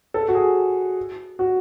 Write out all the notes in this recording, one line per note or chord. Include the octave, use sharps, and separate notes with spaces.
A4
F#4
G#4
F#4